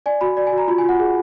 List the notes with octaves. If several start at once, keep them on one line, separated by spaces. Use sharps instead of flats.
D5 G#5
F#4 B5
D5
G#5
F#4
A#5
F4 B5
G#5
F4 F#5
G#4